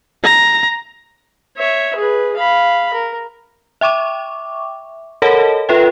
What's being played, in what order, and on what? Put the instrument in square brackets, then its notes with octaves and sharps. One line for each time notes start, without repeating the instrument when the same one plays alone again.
[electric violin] A#5
[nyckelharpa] C#5 E5
G#4 B4
F5 B5
A#4
[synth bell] E5 G5 C#6 D6
A4 A#4 C#5 D#5 F#5 A5
F4 A4 B4 E5 G5